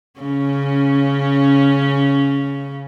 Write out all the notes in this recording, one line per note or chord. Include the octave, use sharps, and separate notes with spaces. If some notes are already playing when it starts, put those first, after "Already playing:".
C#3 C#4